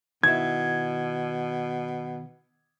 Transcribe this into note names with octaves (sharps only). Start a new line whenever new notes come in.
B2 D#3 E4 G#6